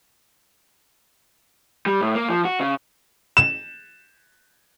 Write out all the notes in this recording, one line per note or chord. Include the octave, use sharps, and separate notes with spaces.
G3
A2
A#3
F3
F#4
C#3
E7